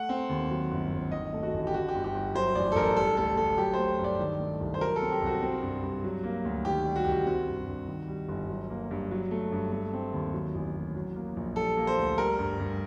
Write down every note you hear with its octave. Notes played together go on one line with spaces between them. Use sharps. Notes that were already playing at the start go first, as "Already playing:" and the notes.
Already playing: A3 F#5
C4
D#2
F#3
G1
G1
D#3 D#5
A3
F#4
A1
G4
D3 F#4
G4
G1
G4
G1
F#3 C5
A1 D5
A4
A1 A#4
G3 A4
D2 A4
D2 A4
F#3 G4
A3 C5
G2
D5
D#3
A3
C2
C5
F#3 A#4
A4
C4
G4
C2 F#4
C4
G2
G2
F#3
A#3
D2
D#3 G4
G3
F#4
C2 G4
F#4
C4 F#4
G2
G2
D#3
G3
G1
F#3
A#3
G2
F#3
A3
G2
A3
C4
D#2
F#3
A1
A1
F#3
A#3
A#1
G3 A4
A#3
C5
D2
G3 A#4
G2
G2